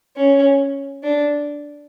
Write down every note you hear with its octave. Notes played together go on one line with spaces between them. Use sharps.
C#4
D4